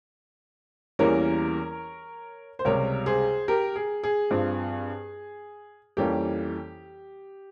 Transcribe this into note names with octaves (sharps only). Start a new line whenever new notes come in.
E2 E3 G3 A#3 C#4 A#4 C#5
C5
C#2 C3 G3 A#4 C#5
G#4 C5
G4 A#4
G#4
G#4
G2 F3 C4
F2 E3 G3 A#3 C#4 G4